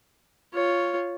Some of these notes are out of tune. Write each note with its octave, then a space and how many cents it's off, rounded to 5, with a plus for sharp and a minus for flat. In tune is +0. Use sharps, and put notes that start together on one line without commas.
F4 +0 C#5 +0